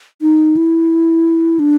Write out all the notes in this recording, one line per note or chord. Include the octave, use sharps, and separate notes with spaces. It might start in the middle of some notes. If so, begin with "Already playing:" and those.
D#4
E4
D4